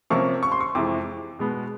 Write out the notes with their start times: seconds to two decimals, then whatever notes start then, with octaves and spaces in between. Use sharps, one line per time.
0.10 C3 F3 A#3 C#4 C#6
0.43 C#6
0.52 C6
0.61 C#6
0.75 F2 C3 E3 G#3 D6
1.39 B2 G#3 B3